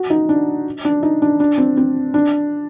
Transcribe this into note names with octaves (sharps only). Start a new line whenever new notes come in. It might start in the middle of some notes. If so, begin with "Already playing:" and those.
Already playing: F#4
D#4
D4
D4
D#4
D4
D4
C4
C4
D4